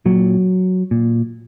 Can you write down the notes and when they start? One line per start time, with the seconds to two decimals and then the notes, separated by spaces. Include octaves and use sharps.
0.06 A#2 F#3
0.91 A#2